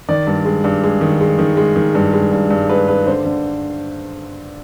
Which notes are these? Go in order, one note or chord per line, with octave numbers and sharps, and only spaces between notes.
D#3 D5
G2
G#3
G2
G#3
D#3
G#3
D#3
G#3
D#3
G2
G#3
G2
G2
G#3 B4
G#3 B4
D3 C5
D3